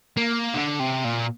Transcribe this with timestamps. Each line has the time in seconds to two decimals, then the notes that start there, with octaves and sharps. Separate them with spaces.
0.17 A#3
0.54 D3
0.79 C3
1.05 A#2